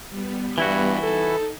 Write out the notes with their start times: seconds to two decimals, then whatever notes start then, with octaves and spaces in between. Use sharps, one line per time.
0.10 G3 B3
0.58 G2 E3 E4 F#4
1.03 D#4 A4